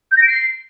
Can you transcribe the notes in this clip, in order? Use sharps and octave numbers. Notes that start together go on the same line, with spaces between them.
G6
A#6
D7
C7